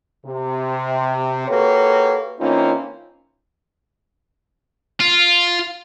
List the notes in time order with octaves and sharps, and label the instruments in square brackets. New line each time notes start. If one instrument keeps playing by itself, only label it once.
[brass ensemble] C3
A#3 F#4 G4 A4 B4 C#5
E3 A#3 C4 C#4 D#4 F4
[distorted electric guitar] F4